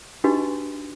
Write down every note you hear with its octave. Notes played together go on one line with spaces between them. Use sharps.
D4 D#4 F#4 G4 B4 D#5